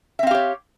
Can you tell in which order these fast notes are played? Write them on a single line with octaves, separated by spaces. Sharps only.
E5 C4 F5 G4 C#5